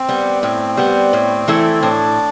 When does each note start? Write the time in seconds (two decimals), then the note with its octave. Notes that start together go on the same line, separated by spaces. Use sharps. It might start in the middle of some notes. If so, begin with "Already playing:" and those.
Already playing: C4
0.09 G3 B3
0.43 A2 C4
0.77 G3 B3
1.13 A2
1.48 E3 A3 E4 A4
1.82 A2 D4